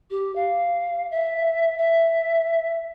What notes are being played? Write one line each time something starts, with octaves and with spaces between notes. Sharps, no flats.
G4
F5
E5
E5